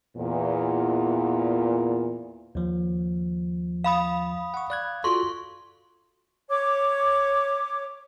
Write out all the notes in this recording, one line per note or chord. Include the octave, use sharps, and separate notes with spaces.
E2 A#2
D#2 F3
F5 B5 D#6
F#5 C#6
D5 F#6 G#6
F4 F#4 A4 C6 C#6
C#5 D6